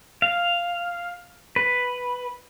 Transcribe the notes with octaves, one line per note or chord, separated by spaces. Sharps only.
F5
B4